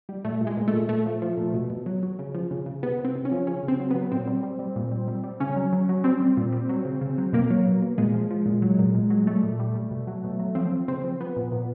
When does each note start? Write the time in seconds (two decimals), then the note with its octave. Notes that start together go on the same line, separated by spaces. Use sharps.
0.09 G3
0.25 A#2 A3
0.41 A#2
0.47 G#3
0.57 A#2
0.68 A3
0.73 A#2
0.89 A#2 A3
1.06 F3
1.22 F3
1.37 A#2
1.54 B2
1.70 B2
1.86 F#3
2.03 F#3
2.19 C#3
2.35 F3
2.51 C#3
2.66 C#3
2.83 C3 B3
2.99 C3
3.05 C4
3.15 C3
3.25 C#4
3.31 F3
3.47 C#3 C#4
3.63 C#3
3.68 C4
3.80 F#3
3.90 F#3 B3
4.12 A#2 C4
4.27 G3
4.43 G3
4.59 G3
4.76 A#2
4.91 G3
5.08 G3
5.24 G3
5.40 C#3 C#4
5.56 F#3
5.73 F#3
5.89 F#3
6.04 G3 C4
6.21 G3
6.37 A#2
6.52 G3
6.69 F#3
6.85 C#3
7.01 C#3
7.18 F#3
7.33 B2 A#3
7.50 F#3
7.66 B2
7.82 B2
7.98 A#2 G#3
8.14 F3
8.31 F3
8.46 A#2
8.62 F#3
8.79 A#2
8.95 A#2
9.10 F#3
9.26 G3 A3
9.43 A#2
9.60 G3
9.75 G3
9.91 B2
10.07 F#3
10.24 B2
10.39 F#3
10.55 F3 C4
10.72 F3
10.88 C#3 C4
11.04 F3
11.21 F3 B3
11.36 A#2
11.52 A#2